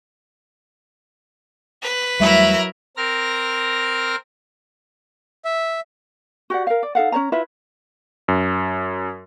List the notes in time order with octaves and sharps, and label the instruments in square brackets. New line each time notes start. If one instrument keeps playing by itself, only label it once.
[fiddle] B4
[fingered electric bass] E2 G3 A3 [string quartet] F#3 E4 A#4 [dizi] E5
[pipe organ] C4 A#4 F6 A#6
[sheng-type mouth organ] E5
[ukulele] F#4 G4 D5 F#5
A#4 F5
D5
D#4 A4 F5 F#5
C#4 C5 C#5 A#5
E4 F4 B4 E5
[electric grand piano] F#2